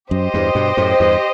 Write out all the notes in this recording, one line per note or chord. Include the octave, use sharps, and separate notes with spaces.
F#2 G4 C5 D#5
E2 G2
G2 B2
F#2 A2
E2 G2